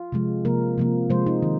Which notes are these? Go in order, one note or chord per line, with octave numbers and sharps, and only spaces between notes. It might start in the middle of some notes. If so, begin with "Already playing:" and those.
Already playing: F4
C3 F3 G#3
C3 F3 A#3 A#4
C3 F3 A#3
C3 F3 G#3 C5
D#4
D#3